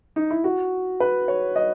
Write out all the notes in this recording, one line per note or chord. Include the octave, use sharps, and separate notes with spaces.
D#4
E4
F#4
B4
C#5
D#5